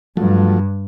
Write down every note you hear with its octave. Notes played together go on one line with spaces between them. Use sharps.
G2 F3 F#3 A3